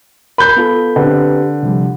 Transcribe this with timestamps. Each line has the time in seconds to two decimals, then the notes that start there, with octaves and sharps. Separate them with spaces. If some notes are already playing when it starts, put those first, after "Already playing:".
0.38 A#4 B5 G6
0.57 B3 F4 A4
0.96 D3 C4 G4 B4
1.63 C3 F3 G3